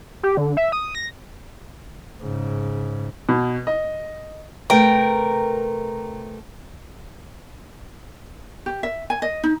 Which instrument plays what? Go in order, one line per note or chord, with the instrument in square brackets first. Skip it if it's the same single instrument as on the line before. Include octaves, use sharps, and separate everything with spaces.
[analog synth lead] G4
D3
E5
D#6
A#6
[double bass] G#2 C#3
[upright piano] B2
D#5
[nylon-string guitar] C3 A3 B4 [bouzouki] A#4 G5
[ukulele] G4
E5
G#5
D#5
D#4